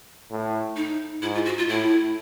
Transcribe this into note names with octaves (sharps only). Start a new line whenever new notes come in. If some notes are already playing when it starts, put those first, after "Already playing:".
A2
D#4
G#2 E4
F4
F#4
F4
A2 E4